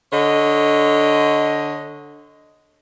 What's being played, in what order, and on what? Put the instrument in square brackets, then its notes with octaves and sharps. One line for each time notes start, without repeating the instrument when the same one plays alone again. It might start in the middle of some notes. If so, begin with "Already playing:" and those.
[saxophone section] D3 C#5 D#5